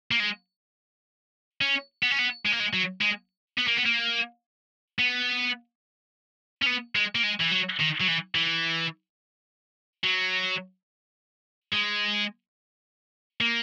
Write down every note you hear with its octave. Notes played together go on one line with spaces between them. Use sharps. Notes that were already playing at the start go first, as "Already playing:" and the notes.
A#3
G#3
C#4
B3
C#4
B3
G#3
A#3
G#3
F#3
G#3
B3
A#3
B3
A#3
B3
C#4
B3
G#3
A#3
G#3
E3
F#3
D#3
F#3
E3
E3
F#3
G#3
A#3